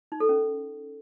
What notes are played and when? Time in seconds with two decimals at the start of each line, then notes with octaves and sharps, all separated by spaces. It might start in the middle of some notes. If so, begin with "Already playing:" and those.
0.12 D#4
0.20 A4
0.29 C#4